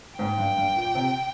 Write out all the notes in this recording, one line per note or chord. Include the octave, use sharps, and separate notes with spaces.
G#2 G5
G2
G2
A#2
C3